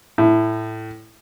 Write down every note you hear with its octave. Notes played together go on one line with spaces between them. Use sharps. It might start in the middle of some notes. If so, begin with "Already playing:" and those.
A2